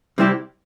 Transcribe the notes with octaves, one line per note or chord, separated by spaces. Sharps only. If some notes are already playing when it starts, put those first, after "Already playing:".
C3 G3 C4 E4 G4